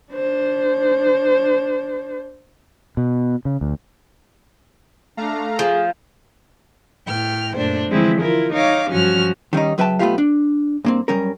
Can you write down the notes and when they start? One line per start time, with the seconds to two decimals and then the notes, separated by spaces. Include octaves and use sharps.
0.13 D4 C5
2.97 B2
3.45 C#3
3.61 D2
5.17 A3 D4 F5 A#5
5.59 F3 G#4
7.07 A2 G5 F6
7.56 F#2 A#2 A3 D4 C5
7.91 D3 E3 F3 G#3 C4 E4
8.21 E4 F4 A#4
8.53 D#4 C#5 F5 D6
8.90 G2 F3 F#3 C#4 F#4 F6
9.53 D#3 G3 C#4 D#4
9.78 C#2 F#3 B4 E5 G5 A5
9.99 B1 A3 B3 F4 G4 F5
10.18 D4
10.85 G2 A#3 C4
11.08 F#2 G3 C#4 A#4